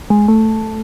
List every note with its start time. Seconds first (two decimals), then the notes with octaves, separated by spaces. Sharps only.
0.10 G#3
0.28 A3